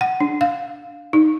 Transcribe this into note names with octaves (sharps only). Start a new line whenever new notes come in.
F#5
D4
F5
D#4